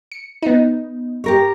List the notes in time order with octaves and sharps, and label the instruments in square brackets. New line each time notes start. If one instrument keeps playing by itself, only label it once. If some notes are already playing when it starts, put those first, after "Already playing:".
[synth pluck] C#7
B3 D#4
[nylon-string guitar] G4 A#4 C#5